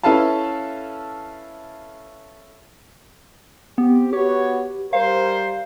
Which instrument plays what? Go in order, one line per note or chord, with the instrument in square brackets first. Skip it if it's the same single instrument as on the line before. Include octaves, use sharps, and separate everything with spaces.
[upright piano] C#4 E4 A4 B4 F5 A5
[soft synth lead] B3 [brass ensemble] C4 G4
[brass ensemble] B3 F#4 C#5 [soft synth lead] G4
[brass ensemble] G3 A#4 C5 [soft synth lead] F5